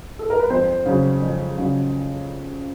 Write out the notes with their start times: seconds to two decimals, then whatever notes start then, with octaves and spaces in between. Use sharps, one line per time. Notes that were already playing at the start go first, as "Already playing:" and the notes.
0.19 A4
0.30 A#4
0.39 B4
0.50 F2 C4 C5
0.86 C#3 F#3
1.22 F2
1.58 C#3 F#3